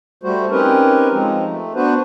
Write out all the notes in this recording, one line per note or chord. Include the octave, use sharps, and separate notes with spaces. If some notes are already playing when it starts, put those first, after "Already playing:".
G3 A3 F#4 C5
C4 C#4 D#4 G4 A#4 B4
F3 G#3 C4 D#4
A3
B3 D4 F#4 B4 C5